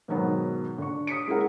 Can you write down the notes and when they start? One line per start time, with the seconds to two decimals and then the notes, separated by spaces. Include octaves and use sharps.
0.08 G#2 B2 D#3 F#3 B3
0.78 D3 C#6
1.07 D#6 B6 C#7 D7
1.27 G#3 C#4 E4 G#4 A#4 F#5